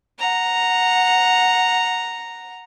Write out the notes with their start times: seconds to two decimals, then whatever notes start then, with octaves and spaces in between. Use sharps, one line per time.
0.19 F#5 A#5